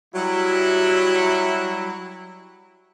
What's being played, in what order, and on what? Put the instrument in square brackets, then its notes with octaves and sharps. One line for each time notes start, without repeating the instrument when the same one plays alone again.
[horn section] F#3 G3 E4